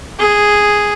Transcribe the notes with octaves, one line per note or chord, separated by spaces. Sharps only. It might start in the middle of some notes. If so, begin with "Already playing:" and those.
G#4